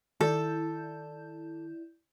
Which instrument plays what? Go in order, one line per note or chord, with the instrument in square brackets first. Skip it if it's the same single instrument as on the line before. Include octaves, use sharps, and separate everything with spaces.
[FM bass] D#3 [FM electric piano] E4 D5 G6 [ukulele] A4